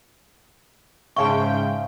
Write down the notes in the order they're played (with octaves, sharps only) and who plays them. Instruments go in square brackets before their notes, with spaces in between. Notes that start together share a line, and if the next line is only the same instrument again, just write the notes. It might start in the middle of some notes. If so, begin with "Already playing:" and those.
[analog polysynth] G#2 C#3 G5 [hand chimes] E5 F5 C6 [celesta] A5 C#6